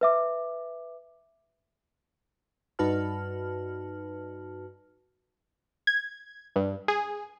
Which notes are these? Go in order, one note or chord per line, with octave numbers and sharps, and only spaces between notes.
B4 E5 D6
G2 D#4 F#4 B4 A5 F6
G#6
G2
G#4